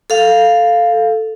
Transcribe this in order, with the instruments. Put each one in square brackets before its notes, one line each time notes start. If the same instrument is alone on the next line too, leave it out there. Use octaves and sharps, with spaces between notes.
[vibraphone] A4 F5